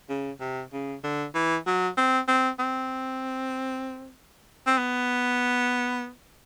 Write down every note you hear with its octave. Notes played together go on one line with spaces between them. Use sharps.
C#3
C3
C#3
D3
E3
F#3
C4
C4
C4
C4
B3